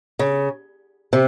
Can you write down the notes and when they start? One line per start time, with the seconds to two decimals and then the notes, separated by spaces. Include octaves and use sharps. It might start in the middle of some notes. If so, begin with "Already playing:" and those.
0.19 C#3
1.13 C3